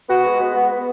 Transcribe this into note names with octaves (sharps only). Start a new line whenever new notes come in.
B3 F#4
G#3
B3
B3
B3